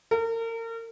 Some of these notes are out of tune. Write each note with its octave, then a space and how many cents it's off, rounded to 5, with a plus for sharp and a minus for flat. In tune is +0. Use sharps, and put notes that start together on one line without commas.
A#4 -35